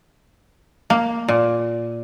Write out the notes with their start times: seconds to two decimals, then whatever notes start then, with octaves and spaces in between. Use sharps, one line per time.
0.90 A#3
1.28 A#2